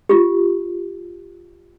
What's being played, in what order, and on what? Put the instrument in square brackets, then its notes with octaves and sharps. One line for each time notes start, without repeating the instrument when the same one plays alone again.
[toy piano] F4 G4